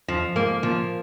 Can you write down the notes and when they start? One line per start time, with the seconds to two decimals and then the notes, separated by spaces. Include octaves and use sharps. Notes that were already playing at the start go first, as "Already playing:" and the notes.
0.08 F2 F3
0.35 G#2 A#3
0.63 A#2 F3